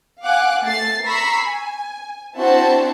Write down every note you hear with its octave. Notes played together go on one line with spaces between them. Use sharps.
F5 F#5 G#5 D6 F#6
A3 A6 C7
A#5 B5 C#6 E6 B6 C7
G#5
C4 D4 E4 F#4 C5 A5